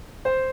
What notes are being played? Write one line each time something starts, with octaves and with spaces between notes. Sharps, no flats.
C5